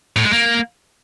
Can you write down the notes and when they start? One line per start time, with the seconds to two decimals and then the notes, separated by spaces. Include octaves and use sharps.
0.16 A2
0.25 G#3
0.33 A#3